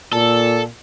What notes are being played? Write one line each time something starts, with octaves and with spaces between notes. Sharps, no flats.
A#2 A4